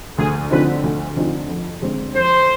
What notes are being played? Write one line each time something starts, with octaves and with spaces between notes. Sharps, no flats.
D2 G#4
D3 F3 C4 D#4 B4
D2
D3 F3 C4 D#4
F2
D3 G#3 C4
F2 C5